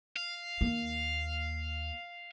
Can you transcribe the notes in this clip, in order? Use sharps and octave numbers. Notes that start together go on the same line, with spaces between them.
F5
D#2 A#3